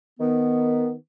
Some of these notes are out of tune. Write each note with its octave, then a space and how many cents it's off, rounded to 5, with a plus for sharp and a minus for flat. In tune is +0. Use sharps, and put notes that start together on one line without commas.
D#3 +0 B3 +0